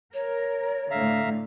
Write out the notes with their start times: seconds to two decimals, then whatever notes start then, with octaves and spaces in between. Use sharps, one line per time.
0.14 A#4 C#5
0.91 A2 D3 E5 F5 A#5